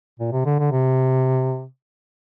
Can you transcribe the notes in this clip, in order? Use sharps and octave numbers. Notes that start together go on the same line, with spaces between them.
A#2
C3
D3
D3
C3